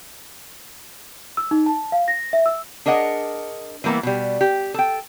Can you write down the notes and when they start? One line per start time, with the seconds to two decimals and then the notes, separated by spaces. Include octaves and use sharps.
1.37 E6
1.51 D#4
1.66 A5
1.92 F5
2.08 A#6
2.33 E5
2.46 E6
2.86 D4 G#4 A#4 D#5 F#5
3.84 E3 G3 A#3 B3 E4
4.03 B2 G3
4.41 G4
4.74 A4 G5